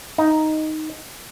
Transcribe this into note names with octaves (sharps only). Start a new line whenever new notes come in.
D#4